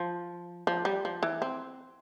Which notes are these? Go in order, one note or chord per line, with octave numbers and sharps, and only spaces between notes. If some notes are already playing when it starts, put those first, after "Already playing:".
Already playing: F3
F3
G3
F3
E3
C4